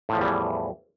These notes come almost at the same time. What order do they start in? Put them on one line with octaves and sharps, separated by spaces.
A2 F3 E2 G3 E3